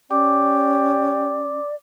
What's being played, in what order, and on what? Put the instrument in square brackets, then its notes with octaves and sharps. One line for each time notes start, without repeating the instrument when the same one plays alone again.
[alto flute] C#4 [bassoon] G4 [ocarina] D5 [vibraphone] D6